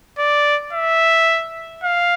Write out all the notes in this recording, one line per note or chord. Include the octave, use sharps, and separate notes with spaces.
D5
E5
F5